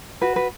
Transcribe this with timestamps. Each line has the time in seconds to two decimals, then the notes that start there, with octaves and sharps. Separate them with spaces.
0.21 F#4 B4
0.36 B4